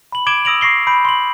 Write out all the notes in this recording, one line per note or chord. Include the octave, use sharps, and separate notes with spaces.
B5 F#7
D6 G#6 D7 E7 F#7 G7
D#6 E6 A#6 D7 F7 F#7
C#6 A#6 C7 G7
B5 G6 D7
C6 F#7